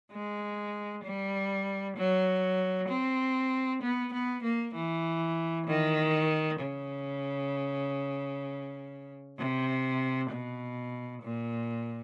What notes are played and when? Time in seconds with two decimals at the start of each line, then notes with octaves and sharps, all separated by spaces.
0.12 G#3
1.04 G3
1.97 F#3
2.89 C4
3.83 B3
4.14 B3
4.44 A#3
4.75 E3
5.67 D#3
6.60 C#3
9.38 C3
10.31 B2
11.23 A#2